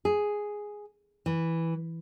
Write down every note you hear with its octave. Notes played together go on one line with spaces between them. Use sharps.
G#4
E3